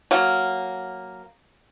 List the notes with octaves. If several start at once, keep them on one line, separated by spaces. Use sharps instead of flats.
F#3 A#3